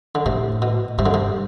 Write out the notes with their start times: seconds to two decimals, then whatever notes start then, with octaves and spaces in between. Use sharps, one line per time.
0.15 D3
0.25 A2 C3
0.62 B2
0.98 G2 C3
1.06 D3
1.14 C3